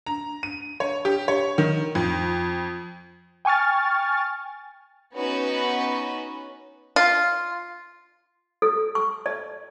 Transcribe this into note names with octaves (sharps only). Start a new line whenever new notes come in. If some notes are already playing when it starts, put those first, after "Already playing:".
A#5
D#7
C#5
G4
C#5
D#3
F2
G5 G#5 C#6 F6 A6
B3 C#4 D#4 F#4 B4
F4
A4
C#6
D5